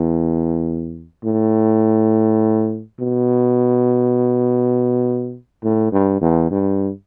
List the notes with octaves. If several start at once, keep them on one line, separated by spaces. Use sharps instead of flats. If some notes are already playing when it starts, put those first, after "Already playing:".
Already playing: E2
A2
B2
A2
G2
E2
G2